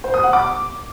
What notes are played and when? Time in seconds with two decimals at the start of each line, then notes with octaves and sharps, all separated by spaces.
0.04 C5
0.14 D#6
0.23 F#5
0.33 D6